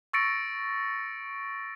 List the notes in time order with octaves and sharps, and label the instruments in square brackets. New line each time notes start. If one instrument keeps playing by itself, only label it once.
[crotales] C#6 E6 A6 A#6 C#7 D7